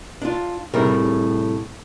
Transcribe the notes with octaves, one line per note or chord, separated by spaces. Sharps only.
D4 F4
A2 C3 G3 G#4 A#4